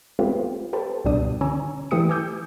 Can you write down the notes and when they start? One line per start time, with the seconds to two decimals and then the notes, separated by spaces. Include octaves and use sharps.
0.19 G#3 A3 B3 C4 F4 G4
0.73 G4 A4 B4 C5
1.05 C#2 G2 B2 G3 D4 D#6
1.41 D3 C#4 C#5 G#5 A#5 E6
1.91 E3 A3 G4 D#6 C#7
2.09 G#5 D6 E6 G6